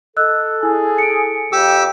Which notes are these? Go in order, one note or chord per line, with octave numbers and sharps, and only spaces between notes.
A4 D#5 E6 F#6
E4 G#4
C#7 D7
F2 G4 D6 E6